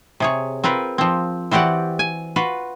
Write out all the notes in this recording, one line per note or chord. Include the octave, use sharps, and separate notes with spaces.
C3 G#4 C#5
C4 F4 A#4 B4
F3 C4
E3 C4 F#4 G4 D5 F#5
G#5
F4 F#4 B4